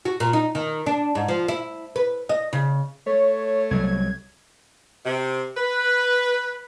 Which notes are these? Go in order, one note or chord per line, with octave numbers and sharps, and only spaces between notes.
F#4
A#2
D#4
D#3
D4
G#2
F3
E4
B4
D#5
C#3
A3 C#5
C2 F#3 G#6
C3
B4